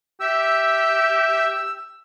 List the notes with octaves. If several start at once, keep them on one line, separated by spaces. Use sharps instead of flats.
G4 E5 E6